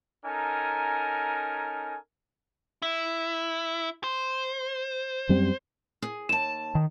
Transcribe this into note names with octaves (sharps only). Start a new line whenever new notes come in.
C#4 D#4 A4 A#4 G#5
E4
C5
F#2 G3 C4
G#4
D#2 A5 E7
D#3